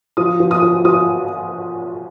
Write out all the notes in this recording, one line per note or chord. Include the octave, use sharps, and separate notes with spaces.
F3 D#6
F3
D#6
F3
F3 D#6